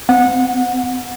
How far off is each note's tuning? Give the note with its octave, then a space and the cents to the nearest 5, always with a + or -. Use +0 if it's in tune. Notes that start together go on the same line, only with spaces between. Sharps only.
C4 -45 F#5 -20